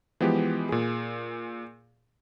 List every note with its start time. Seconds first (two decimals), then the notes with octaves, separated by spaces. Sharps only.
0.20 E3 F3 G#3 B3 G4
0.69 A#2 G#4